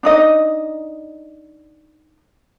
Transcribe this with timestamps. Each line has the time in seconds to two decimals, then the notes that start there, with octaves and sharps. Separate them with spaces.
0.03 D4 D#4 D#5